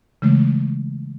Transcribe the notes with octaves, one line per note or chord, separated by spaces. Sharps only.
C#3 E3 G#3 A3